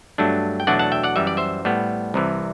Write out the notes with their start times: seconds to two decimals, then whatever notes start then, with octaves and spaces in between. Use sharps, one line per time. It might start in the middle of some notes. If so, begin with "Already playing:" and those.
0.18 G2 F#3 A3 D4
0.60 G5
0.67 E2 B2 F#3 A3 D4 D5 F#5
0.79 F#5 A5
0.92 E5 G5
1.03 D5 F#5
1.16 F#2 E3 G3 E5
1.27 D5
1.37 C5 E5
1.65 A2 G3 B3
2.14 C2 C3 E3